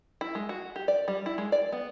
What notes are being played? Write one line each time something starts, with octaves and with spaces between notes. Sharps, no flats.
E4
G#3
F#4
G4
D5
G3
E4
G#3
D5
B3